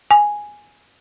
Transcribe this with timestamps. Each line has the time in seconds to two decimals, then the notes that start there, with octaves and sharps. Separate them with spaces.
0.11 G#5